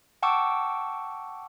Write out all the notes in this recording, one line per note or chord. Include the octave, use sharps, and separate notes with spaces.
F#5 G5 A5 C#6 D6 E6